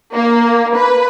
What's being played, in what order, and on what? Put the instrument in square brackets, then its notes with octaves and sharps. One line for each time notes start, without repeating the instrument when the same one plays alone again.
[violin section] A#3
B4